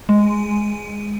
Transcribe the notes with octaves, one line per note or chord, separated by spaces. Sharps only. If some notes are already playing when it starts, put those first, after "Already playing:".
G#3